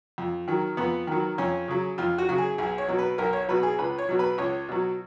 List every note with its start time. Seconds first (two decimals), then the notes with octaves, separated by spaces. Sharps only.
0.18 F2
0.48 D#3 F#3
0.77 F2 B3
1.07 D#3 F#3
1.38 F2 C#4
1.68 C#3 F#3
1.98 F2 F4
2.18 F#4
2.29 C#3 F#3 F#4
2.38 G#4
2.58 B1 G#4
2.78 C#5
2.88 B2 F#3
2.98 B4
3.18 B1 A#4
3.33 C#5
3.48 B2 F#3 B4
3.63 G#4
3.78 C#2 B4
3.98 C#5
4.09 B2 F#3
4.19 B4
4.38 C#2 C#5
4.68 B2 F#3